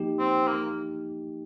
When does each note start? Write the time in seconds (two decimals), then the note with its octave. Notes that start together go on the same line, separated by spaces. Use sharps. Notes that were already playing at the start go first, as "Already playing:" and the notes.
Already playing: F3 A#3 D#4 G4
0.19 C4
0.48 A#3